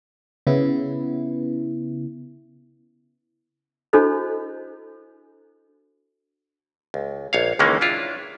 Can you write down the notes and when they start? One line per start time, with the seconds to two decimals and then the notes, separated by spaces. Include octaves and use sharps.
0.47 C#3 B3 E4
3.93 D4 E4 F#4 A4 C5 D#5
6.94 C#2
7.33 A#1 C#5 F5
7.59 C#2 D#3 E3 G#3 A#3 C#4
7.81 D4 E4 F4